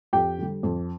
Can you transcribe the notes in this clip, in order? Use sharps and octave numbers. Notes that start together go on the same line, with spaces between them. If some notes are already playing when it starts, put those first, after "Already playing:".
F2 G4 G5
D3 G3
F2